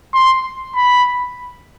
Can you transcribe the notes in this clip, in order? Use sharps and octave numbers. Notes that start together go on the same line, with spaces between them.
C6
B5